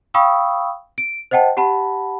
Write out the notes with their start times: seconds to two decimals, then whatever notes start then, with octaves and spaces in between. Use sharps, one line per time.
0.14 F5 G5 B5 C#6 D#6 E6
0.98 D7
1.31 C5 D#5 F#5 G5 A5
1.57 G4 F#5 A5 B5